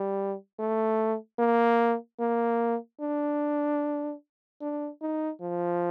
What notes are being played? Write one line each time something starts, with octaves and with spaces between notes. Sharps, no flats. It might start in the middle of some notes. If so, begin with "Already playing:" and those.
Already playing: G3
A3
A#3
A#3
D4
D4
D#4
F3